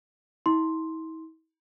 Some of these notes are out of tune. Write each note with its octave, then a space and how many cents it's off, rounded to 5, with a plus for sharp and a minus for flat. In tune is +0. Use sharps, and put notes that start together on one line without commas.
E4 -45 C6 +0